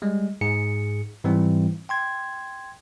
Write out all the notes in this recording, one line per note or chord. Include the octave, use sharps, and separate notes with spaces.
G3 G#3
G#2 G#4 C#7
G#2 E3 G3 C4 E4
G5 C6 G#6